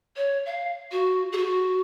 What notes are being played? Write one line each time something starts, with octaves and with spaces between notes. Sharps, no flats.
C#5
F5
F#4
G#4
F#4